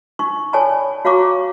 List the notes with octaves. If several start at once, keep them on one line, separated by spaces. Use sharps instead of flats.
D#4 C#6
A4 C#5 D5 G#5 A5 B5
F#4 C#5 F5 A#5 C#6 D6